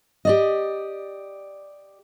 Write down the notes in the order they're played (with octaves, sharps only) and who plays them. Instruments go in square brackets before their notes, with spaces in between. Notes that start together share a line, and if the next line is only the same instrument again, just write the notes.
[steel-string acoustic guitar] G4 D5 D#5